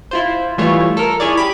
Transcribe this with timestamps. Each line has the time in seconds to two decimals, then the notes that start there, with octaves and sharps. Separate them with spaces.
0.11 E4 F4 C5
0.58 E3 G3 A3 F4 C#5
0.97 A4 A#4
1.20 E4 G#4 C#5 D5
1.37 G4 B5